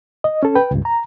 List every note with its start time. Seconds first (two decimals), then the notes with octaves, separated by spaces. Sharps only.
0.24 D#5
0.43 C#4 A4
0.56 B4 G5
0.71 C#2 G2
0.85 A#5